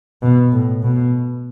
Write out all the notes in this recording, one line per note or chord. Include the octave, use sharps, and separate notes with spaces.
B2
A2
B2